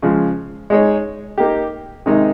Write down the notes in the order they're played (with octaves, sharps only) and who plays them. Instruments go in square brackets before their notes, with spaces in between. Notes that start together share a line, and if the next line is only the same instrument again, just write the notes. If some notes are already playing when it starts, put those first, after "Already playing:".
[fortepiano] C#3 F3 G#3
G#3 D#4 G#4 C#5
A#3 D#4 G4
C3 D#3 G#3 D#4